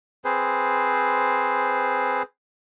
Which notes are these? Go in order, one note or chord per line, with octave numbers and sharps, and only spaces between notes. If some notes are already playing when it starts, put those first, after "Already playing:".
C4 G#4 B4 C5